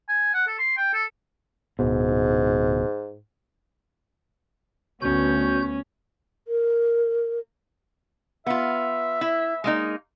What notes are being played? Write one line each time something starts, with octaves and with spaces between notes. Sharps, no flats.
G#5
F#5
A4
C6
G5
A4
D1 G#2 B2
D2 B3 C#4 F#4 G6
A#4
B3 F4 E5
E4
G#3 A#3 D#4